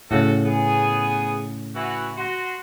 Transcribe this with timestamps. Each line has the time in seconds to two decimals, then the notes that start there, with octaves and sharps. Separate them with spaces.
0.11 A2 C#3 F#4 A4
0.45 B3 G#4
1.75 E3 F#4
2.17 F#4 C6